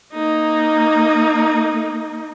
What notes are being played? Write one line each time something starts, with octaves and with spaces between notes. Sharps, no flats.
A#3 D#4